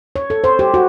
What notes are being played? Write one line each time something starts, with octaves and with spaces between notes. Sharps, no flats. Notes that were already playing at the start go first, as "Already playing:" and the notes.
C#5
A4
C5
G4
F#4